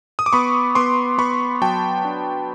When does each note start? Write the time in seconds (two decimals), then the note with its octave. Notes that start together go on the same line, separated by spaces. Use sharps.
0.19 D#6
0.26 D6
0.33 B3 B5 C#6
0.75 B3 C6 D6
1.18 B3 B5 C#6
1.61 F#3 G5 A5
2.05 D4